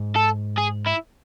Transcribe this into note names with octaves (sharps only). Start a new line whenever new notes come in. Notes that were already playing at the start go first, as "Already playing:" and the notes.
Already playing: G#2
A4
G#4
E4